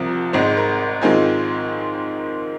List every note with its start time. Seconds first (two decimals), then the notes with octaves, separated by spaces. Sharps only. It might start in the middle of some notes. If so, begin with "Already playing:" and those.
Already playing: C2 C3 F3 C4 A#4
0.33 G#1 G#2 G#3 C5
0.57 A#4
1.02 G#2 D#3 G#3 C4 F4 G#5